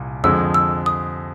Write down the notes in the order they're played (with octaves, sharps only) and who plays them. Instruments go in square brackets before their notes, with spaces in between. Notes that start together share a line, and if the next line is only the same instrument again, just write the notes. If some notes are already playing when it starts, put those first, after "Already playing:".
Already playing: [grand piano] C2 A#2
[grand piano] F2 D3 F3 G#3 [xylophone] E6
[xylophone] E6
D#6